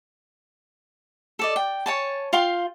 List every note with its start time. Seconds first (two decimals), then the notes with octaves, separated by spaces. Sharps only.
1.39 A4 D5 D#5
1.56 G5
1.86 C#5 G#5 A5
2.33 F4 F5 G5 C6